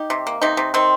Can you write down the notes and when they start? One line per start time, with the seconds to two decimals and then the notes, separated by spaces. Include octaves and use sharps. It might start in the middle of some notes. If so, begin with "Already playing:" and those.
Already playing: D#4 G4
0.10 C3
0.27 A#3
0.41 C3 D#4
0.57 C3
0.74 D#3 C4